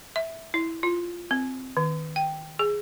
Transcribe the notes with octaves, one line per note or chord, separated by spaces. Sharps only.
E5
E4
F4
C4
D#3
G5
G#4